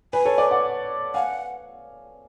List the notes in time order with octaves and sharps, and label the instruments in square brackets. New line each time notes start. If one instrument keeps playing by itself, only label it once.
[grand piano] B4 [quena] G#5
[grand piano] A4 C#5
B4 D5
D5 F#5
[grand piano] F5 G#5 [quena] F#5